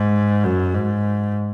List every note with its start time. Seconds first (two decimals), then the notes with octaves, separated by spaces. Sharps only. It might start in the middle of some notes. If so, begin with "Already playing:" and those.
Already playing: G#2
0.44 F#2
0.74 G#2